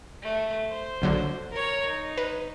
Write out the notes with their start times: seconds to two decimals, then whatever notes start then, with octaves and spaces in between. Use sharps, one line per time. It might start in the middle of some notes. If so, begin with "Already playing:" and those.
0.22 A3
0.69 C5
1.02 A#1 D3 F#3
1.51 A#4 C#5
1.85 D#4
2.17 B4